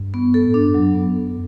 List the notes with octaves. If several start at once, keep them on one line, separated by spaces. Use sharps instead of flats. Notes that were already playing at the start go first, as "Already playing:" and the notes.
Already playing: G2
B3
A4
A2
D4
G2
F#2 F#3
B3
A4